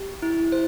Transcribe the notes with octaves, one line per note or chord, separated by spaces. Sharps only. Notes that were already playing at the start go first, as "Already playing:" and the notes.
Already playing: G4
E4
C5